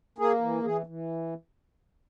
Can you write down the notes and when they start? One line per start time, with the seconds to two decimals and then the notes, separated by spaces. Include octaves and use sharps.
0.18 A#3 G#4
0.41 E3
0.63 E3 G#4
0.86 E3